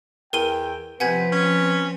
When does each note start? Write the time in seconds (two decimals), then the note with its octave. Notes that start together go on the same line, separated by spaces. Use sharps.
0.33 E2 A#4 G5 D#7 G7
1.00 C3 F3 C4 B4 F#5 G#5 G#6
1.33 C#4